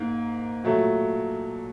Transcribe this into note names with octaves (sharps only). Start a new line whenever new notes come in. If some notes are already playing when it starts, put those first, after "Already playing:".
Already playing: G#2 A#3
A#2 F#3 A3